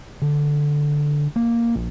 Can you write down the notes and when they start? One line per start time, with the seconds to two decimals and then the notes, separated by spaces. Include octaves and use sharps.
0.22 D3
1.36 A#3
1.75 A#1